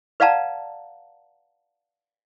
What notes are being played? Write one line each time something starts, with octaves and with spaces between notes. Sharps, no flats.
B4 D5 F5 F#5 A5 A#5